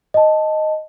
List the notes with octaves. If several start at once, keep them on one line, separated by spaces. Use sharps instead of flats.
D#5 A5